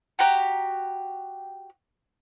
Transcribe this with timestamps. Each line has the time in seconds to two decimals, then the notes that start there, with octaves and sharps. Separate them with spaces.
0.19 F#4 G4 A#5